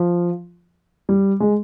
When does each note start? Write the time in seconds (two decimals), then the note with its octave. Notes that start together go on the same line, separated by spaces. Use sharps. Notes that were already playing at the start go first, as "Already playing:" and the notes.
Already playing: F3
1.09 G3
1.40 G#3